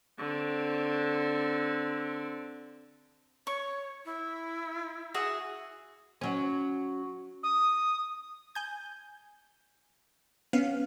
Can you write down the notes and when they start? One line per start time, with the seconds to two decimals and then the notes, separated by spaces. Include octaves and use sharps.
0.19 D3 C4
3.47 C#5 C#6
4.05 E4
5.14 F#4 G#4 E5
6.21 F#3 C#4
7.43 D#6
8.55 G#5 G6
10.53 B3 C#4 F5